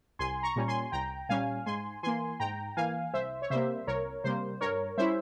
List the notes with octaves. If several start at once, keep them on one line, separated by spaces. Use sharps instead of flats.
C2 G#5 C6
A#5 C#6
A#2 G3 C#4
G#5 C6
C2 G5 A#5
A#2 G3 C#4 F5 G#5
G#2 G#5 C6
E3 A#3 G#5 C6
G#2 G5 A#5
E3 A#3 F5 G#5
C2 C5 E5
C#5
C3 G3 A#3 C5 E5
C2 A#4 C#5
C3 G3 A#3 C5
G2 A#4 C#5
G3 C#4 E4 C5 E5